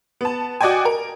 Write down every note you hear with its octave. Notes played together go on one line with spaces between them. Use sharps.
B3 A5
F#4 D5 D#5 G5 G#5
A#4